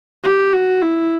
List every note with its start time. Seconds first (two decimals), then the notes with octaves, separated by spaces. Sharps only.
0.24 G4
0.53 F#4
0.82 E4